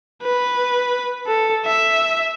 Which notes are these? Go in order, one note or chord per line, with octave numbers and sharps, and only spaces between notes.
B4
A4
E5